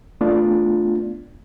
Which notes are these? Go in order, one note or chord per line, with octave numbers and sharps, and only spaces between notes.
A3 B3 D4 F4